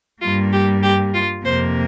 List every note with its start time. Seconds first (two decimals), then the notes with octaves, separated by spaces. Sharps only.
0.22 G2 G3 A#3 F4
0.52 G4
0.82 G4
1.14 F4
1.45 F2 C3 A#3 C5